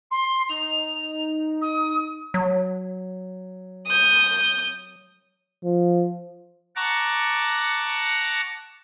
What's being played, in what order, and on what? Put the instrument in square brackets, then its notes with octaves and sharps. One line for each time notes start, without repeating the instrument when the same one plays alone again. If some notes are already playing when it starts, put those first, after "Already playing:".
[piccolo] C6
[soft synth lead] D#4 [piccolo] F7
[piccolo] D#6
[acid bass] F#3
[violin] D#6 G6
[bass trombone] F3
[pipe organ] F#5 A5 A#5 C#6 D6